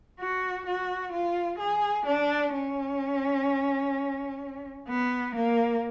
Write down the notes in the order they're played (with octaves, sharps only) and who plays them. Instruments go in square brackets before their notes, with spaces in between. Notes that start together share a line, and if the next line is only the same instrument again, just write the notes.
[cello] F#4
F#4
F4
G#4
D4
C#4
B3
A#3